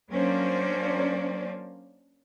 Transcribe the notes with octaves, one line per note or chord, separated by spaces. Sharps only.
F#3 A#3 C#4 D4 C5 D5